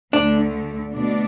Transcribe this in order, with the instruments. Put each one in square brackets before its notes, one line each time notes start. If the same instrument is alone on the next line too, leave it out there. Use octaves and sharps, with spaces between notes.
[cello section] D2 D3 A3 [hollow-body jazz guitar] D4
[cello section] B2 A3 D4